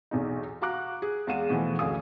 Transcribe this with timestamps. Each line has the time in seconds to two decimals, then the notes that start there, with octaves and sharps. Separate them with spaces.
0.11 B1 E2 D#4
0.62 F#4 F5 A#5 D6 F#6
1.02 G#4
1.27 E2 G#3 F5 F#5 D#7 E7
1.50 B2 E3 F3 A3
1.79 F#1 D2 G#4 F5 G#5 D#6